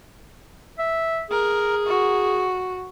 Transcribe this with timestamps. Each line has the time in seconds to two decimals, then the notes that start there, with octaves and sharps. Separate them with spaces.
0.79 E5
1.31 G#4 A#4
1.87 F#4